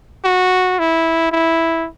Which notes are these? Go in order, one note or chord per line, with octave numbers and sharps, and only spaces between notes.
F#4
E4
E4